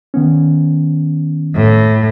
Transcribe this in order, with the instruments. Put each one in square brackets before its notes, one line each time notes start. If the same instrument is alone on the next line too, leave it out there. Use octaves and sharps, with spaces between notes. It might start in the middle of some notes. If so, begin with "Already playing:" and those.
[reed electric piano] D#3 B3 C#4
[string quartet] A2